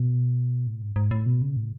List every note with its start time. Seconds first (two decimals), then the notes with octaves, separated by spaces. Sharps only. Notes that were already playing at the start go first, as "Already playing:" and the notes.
Already playing: B2
0.67 A2
0.82 G#2
0.96 G#2
1.11 A2
1.26 B2
1.42 C#3
1.57 A2